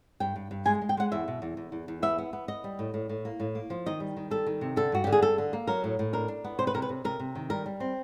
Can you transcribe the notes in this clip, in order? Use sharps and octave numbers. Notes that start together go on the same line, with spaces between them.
G2 G5
G2
G2
G#3 G#5
G#3
G5
G#3 F#5
E2 E5
B2
E2
E2
E2
E2
B3 E5
B3
B3
B3 D#5
G3
A2
A2
A2
A#3
A2
A#3
F3
D#3 D#5
G3
D#3
G3 A4
D#3
C3
D3 A4
G2 F#4
D3 G4
G#4
G2 A4
D3
A#3
F#3 A#4
A2
A2
D4 A#4
D4
B3
C3 C5
B4
C3 A#4
B4
C3
C3 A#4
C3
D#3
G3 A#4
G3
C4